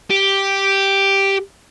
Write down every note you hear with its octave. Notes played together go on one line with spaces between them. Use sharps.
G4